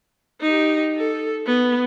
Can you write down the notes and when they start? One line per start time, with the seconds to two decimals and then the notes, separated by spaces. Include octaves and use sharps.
0.41 D#4 G4
0.97 A4
1.46 B3